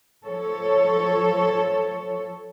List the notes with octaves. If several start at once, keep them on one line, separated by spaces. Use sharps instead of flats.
F3 A4 C#5